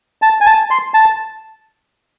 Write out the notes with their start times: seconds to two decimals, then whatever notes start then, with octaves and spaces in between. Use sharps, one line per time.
0.22 A5
0.41 G#5
0.46 A5
0.71 C6
0.94 A5